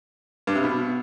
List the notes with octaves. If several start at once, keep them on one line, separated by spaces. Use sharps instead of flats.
G2
C3
B2